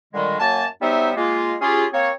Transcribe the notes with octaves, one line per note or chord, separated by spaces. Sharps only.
A#2 D3 D#3 G3 G#3
F#2 F#3 A#3 G#5 A5
F#3 G3 B3 D#4 C5 E5
G#3 A#3 F4
C#4 F4 G4 G#4
A#3 C4 C#5